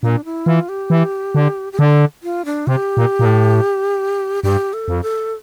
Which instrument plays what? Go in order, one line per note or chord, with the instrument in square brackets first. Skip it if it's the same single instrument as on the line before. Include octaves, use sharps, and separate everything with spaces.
[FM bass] A#2 [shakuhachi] D4
[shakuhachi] E4
[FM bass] E3 [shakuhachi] F4
[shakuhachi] G4
[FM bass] E3
D3
[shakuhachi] G4
[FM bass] D3 [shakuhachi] A4
[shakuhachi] F4
D4
[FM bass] C3 [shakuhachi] G4
[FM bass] A#2
A#2
A2
[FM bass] G2 [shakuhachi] G4
[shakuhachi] A4
[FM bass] F2
[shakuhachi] A4